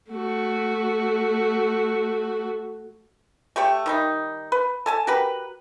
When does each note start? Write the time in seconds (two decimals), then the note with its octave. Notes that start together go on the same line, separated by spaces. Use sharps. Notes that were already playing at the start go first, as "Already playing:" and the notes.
0.11 A3 F#4
3.56 A3 G4 C#5 G5
3.86 D#3 G3 D#4
4.52 B4
4.86 A4 G#5 A5
5.07 F#4 G4 A#4 B4